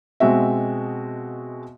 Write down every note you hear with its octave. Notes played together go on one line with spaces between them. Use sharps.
B2 G#3 C4 F#4 E5